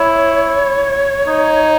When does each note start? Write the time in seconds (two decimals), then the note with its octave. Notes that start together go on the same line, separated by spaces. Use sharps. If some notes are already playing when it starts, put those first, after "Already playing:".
Already playing: E4 C#5
1.27 D#4